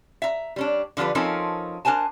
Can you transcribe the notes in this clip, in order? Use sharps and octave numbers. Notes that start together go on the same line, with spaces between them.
E5 A#5
G3 C#4 D4
D3 F3 G3 D4 B4
F3 C4 C#4 D#4 A4 A#4
D4 A#4 C5 G#5 A5